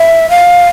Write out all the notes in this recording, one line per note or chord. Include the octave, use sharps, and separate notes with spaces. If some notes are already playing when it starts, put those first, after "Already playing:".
Already playing: E5
F5